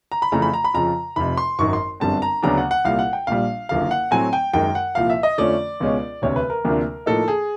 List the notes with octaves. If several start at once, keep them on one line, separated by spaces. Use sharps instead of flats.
A#5
B5
F2 C#3 E3 A3 A#5
B5
A#5
B5
F2 C#3 F3 A#5
F1 F2 C3 B5
C6
G#1 F#2 D#3 C#6
C6
G1 F#2 D3 G3 C4 A5
A#5
D2 C#3 F#3 B3 D4 A#5
F#5
F#5
C2 A#2 G3 F5
F#5
G5
A#1 A#2 G3 F5
F#1 F#2 D3 F3 F5
F#5
A2 F#3 A3 C4 G#5
G5
F#2 D#3 G#3 G5
F#5
C2 A#2 F3 F5
E5
D#5
F2 D3 F3 A3 C#4 D5
C#2 B2 G#3 C#4
E1 D2 C3 C#5
B4
A#4
D2 C3 F3 A#3 D4
A2 F3 A#3 D#4 A4
G#4